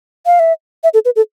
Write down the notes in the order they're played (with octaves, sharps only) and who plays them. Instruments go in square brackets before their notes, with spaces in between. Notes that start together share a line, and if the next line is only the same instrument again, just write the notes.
[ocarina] F5
E5
E5
A4
B4
A4